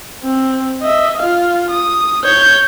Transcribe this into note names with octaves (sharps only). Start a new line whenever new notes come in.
C4
D#5 E5
F4 F5
D#6
C#5 G6